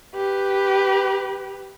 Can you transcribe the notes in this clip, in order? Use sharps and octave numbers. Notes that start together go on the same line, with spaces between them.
G4 B4